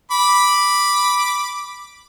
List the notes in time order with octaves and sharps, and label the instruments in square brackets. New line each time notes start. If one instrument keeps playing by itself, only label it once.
[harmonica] B5 D6